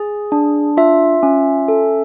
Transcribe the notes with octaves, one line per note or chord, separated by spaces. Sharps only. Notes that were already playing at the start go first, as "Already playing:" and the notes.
Already playing: G#4
D4
F4 E5
C#4
A4